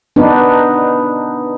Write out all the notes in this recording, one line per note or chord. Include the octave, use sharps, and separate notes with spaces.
B3 D4 D#4 B4